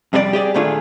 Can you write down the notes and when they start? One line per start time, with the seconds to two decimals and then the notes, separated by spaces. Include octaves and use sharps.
0.13 F2 C3 G3 G4 D5
0.33 G4 G#4 D5
0.54 A#2 D#3 A3 D4 F4 G#4